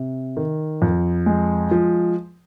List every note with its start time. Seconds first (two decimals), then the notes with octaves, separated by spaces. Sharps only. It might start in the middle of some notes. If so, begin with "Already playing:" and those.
Already playing: C3
0.37 D#3
0.82 F2
1.26 G#3
1.71 F3